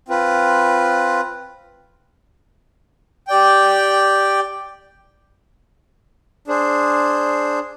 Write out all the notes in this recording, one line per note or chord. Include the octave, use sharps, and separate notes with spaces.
C4 F4 B4
G4 D5 G5
D4 G#4 C5